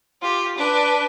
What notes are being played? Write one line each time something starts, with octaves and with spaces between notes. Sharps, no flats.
F4 G4
D4 B4